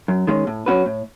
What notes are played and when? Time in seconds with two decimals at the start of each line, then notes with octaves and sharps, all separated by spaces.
0.08 F#2
0.27 D#3 G#3 C#4
0.47 A2
0.66 F#3 C#4 F#4 B4
0.86 A2